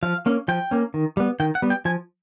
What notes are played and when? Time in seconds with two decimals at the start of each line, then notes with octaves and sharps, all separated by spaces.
0.03 F3 F5
0.26 A#3 C#4
0.48 F3 G5
0.71 A#3 C#4
0.94 D#3
1.17 G3 B3
1.40 D#3 G5
1.55 F#5
1.62 G3 B3
1.70 G5
1.85 F3 G#5